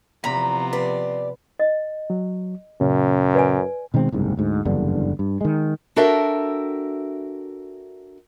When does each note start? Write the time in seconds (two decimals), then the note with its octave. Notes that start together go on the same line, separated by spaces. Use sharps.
0.24 E2 C3 F3 B3 A#5 B5
0.73 G4 B4 D5
1.59 D#5
2.10 F#3
2.81 F#2 A#2 C#3 C#4
3.35 B4 D5 G#5
3.94 B2 D#3 G#3 C4
4.12 F#1 C2 G#2
4.37 D2 G#2
4.65 F#1 E2 G2 D3
5.19 G2
5.41 D#3 G#3
5.96 D4 F#4 A4 A#4 E5 G5